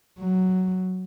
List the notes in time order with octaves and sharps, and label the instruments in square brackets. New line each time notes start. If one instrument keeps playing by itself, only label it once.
[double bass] F#3